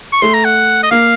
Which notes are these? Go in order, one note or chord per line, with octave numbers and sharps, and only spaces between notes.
C#6
A3 C6
A#5
F#5
D#5
A#3 F5